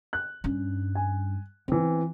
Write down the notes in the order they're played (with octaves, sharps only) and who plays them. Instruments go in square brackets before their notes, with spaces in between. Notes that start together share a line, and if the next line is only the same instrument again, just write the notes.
[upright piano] F#6
[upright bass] G2 C#4
[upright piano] G#5
[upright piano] E3 C4 [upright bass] B3